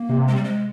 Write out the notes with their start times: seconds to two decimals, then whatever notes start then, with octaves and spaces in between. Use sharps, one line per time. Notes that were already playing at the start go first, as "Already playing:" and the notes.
Already playing: A#3
0.09 C3
0.28 G#3
0.36 G3
0.44 G#3